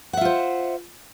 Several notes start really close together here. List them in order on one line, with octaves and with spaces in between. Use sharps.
F#5 E5 F4 C5